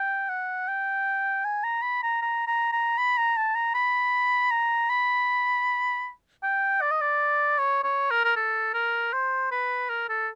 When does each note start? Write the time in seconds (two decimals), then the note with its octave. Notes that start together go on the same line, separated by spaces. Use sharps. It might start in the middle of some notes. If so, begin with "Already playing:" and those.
Already playing: G5
0.29 F#5
0.68 G5
1.44 G#5
1.64 A#5
1.82 B5
2.03 A#5
2.22 A#5
2.47 A#5
2.73 A#5
2.98 B5
3.18 A#5
3.37 A5
3.55 A#5
3.74 B5
4.51 A#5
4.90 B5
6.43 G5
6.82 D5
6.91 D#5
7.01 D5
7.58 C#5
7.84 C#5
8.11 A#4
8.25 A#4
8.36 A4
8.74 A#4
9.13 C5
9.51 B4
9.89 A#4
10.09 A4